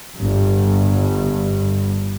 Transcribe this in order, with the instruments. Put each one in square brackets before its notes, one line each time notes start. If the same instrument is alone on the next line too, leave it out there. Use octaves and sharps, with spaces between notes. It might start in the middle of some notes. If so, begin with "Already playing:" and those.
[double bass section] G1 G2